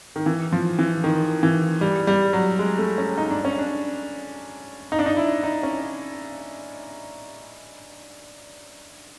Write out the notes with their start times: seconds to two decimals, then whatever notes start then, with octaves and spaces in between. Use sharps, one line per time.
0.16 D#3
0.26 E3
0.52 F3
0.79 E3
1.04 D#3
1.43 E3
1.81 G3
2.07 G3
2.33 F#3
2.59 G#3
2.78 A3
2.98 C#4
3.18 D#4
3.31 D4
3.45 C#4
3.58 D4
4.92 D#4
4.99 D4
5.06 D#4
5.17 E4
5.43 D#4
5.63 C#4